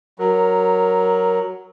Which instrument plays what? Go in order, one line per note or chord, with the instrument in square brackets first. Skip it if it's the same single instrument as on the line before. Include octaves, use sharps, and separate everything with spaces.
[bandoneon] F#3 [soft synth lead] A#4